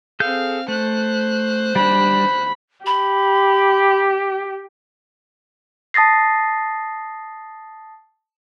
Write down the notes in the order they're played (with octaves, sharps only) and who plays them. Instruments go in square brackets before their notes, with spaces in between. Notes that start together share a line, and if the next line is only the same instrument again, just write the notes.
[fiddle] C4 F5 [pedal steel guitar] G#4 A4 G6
[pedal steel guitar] A3 [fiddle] C5 F#6
[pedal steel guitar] G3 D4 [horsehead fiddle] B5
[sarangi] G4 [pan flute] B5
[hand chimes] A5 D#6 A6 A#6 C7